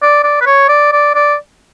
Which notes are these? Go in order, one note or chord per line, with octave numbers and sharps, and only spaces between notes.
D5
D5
B4
C#5
D5
D5
D5